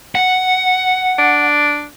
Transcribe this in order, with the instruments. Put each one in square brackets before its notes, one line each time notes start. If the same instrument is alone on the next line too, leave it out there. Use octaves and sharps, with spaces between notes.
[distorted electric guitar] F#5
[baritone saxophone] D4